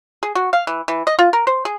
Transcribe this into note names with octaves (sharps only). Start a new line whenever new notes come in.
G#4
F#4
F5
E3
E3
D#5
F4
A#4
C5
G#4